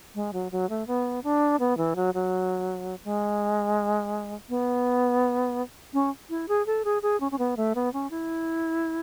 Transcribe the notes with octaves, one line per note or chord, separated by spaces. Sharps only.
G#3
F#3
F#3
A3
B3
D4
B3
E3
F#3
F#3
G#3
B3
C#4
E4
G#4
A4
G#4
G#4
C#4
C#4
B3
A3
B3
C#4
E4